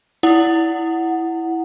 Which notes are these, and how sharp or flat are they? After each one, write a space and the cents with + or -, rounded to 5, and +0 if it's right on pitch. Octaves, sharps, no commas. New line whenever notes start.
E4 +0 F#5 +0